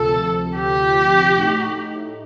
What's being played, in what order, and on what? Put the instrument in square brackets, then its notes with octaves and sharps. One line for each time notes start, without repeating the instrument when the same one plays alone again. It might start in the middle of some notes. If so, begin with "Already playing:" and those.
Already playing: [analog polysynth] D2 C3 F3 [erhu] A4
[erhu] G4
[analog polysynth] A2 A3 D#4